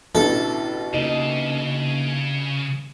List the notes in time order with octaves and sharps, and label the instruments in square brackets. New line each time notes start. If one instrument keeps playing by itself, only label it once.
[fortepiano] A1 B2 D3 [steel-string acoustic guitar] E4 [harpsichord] A4
[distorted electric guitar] C#3 [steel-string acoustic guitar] A#3 D#4 D#5